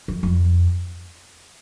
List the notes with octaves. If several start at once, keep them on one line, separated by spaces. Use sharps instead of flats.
F2
F2